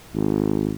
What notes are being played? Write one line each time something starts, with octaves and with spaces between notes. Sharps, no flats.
G#1